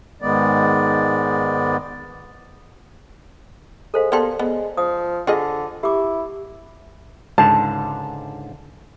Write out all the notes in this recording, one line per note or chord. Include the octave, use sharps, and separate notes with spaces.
G#2 D#3 G#3 B3 D5
G#3 A4 C5 F5
A#3 B3 G4 A4 D5 C6
G#3 B3
F3 D#6
D3 F4 G#4 D#5
E4 G4 D6
C#2 G#2 D3 A5